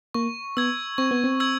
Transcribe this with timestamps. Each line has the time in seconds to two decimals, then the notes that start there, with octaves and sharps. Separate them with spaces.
0.14 A#3 C#6
0.57 B3 E6 G#6
0.98 C4 C#6
1.11 B3
1.24 C4
1.40 E6 G#6